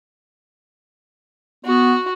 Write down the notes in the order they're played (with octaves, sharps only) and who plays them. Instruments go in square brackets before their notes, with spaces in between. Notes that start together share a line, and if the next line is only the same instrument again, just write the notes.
[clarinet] B3 [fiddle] F#4